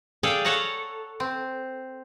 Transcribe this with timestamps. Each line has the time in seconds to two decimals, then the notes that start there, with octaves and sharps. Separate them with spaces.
0.23 G#4 A4 D5 F5 G5
0.45 A4 C#5 F#5 A5 A#5
1.20 C4